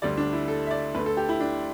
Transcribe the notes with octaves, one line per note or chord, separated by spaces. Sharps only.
D2 D3 G3 D5
D4
E4
A4
E5
D5
D2 D3 A3 B4
A4
G4
E4
D4